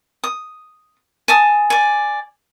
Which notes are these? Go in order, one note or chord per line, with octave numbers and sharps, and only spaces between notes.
D#6
G#5 A5 D#6
D5 G#5